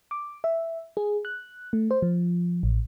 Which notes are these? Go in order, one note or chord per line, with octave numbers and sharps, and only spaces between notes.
D6
E5
G#4
F#6
A3
C5
F3
A1